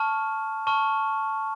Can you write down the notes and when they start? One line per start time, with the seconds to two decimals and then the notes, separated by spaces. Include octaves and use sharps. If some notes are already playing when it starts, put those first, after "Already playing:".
Already playing: A5 C#6 F6
0.67 A5 C#6 F6